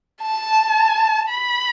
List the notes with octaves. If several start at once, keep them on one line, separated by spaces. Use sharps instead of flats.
A5
B5